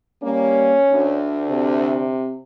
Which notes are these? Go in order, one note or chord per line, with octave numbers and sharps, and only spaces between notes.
G3 A#3 C#4
D2 D4
C3